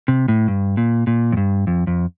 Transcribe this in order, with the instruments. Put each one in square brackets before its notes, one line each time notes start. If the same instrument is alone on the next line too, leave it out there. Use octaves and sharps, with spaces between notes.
[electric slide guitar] C3
A2
G2
A#2
A#2
F2
G2
F2
F2